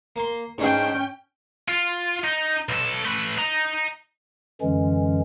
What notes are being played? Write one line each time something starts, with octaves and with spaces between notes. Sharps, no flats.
A#3 C6
G#2 C#4 D4 G#4 G5
F4
D#4
B1 A4
A3 B4
D#5 A#5
F#2 D3 E3 G#3 C#4